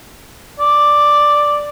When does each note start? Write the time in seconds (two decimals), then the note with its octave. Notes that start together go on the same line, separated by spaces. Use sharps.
0.59 D5